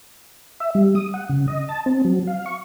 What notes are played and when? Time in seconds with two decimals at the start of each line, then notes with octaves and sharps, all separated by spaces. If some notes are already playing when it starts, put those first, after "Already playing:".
0.60 E5
0.75 G3
0.95 D#6
1.14 F#5
1.29 C#3
1.48 D#5
1.69 A5
1.86 C4
2.04 F#3
2.27 F5
2.46 C#6